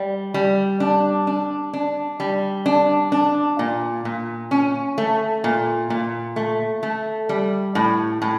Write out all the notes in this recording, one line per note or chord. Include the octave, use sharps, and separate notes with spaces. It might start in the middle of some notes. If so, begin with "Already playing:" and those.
Already playing: G3
G3
D4
D4
D4
G3
D4
D4
A#2
A#2
C#4
A3
A#2
A#2
A3
A3
G3
A2
A2